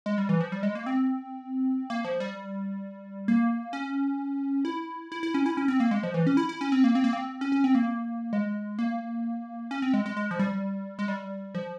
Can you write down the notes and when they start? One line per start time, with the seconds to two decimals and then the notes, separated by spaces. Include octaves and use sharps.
0.06 G#3
0.18 G3
0.29 E3
0.41 F3
0.52 G3
0.63 G#3
0.75 A#3
0.86 C4
1.90 A#3
2.05 F3
2.20 G3
3.28 A#3
3.73 C#4
4.65 E4
5.12 E4
5.23 E4
5.34 C#4
5.46 E4
5.57 C#4
5.68 C4
5.80 A#3
5.91 G#3
6.03 F3
6.14 E3
6.27 C#4
6.37 E4
6.49 E4
6.61 C#4
6.72 C4
6.84 A#3
6.95 C4
7.04 A#3
7.13 C4
7.41 C#4
7.52 C#4
7.64 C4
7.75 A#3
8.33 G#3
8.79 A#3
9.71 C#4
9.82 C4
9.94 G#3
10.06 G#3
10.17 G#3
10.31 F3
10.39 G3
10.99 G#3
11.08 G3
11.55 F3